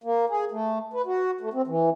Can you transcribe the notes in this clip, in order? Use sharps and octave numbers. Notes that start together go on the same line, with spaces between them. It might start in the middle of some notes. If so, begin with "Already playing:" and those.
A#3
G#4
A3
B4
F#4
A3
C4
E3